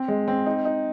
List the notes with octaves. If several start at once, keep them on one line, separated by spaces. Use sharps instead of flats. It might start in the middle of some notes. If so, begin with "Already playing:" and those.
Already playing: C4
G#3
C4
D#4
D#4